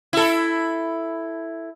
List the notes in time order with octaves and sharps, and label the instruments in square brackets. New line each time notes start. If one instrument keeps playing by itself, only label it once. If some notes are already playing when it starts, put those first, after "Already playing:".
[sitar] E4 A4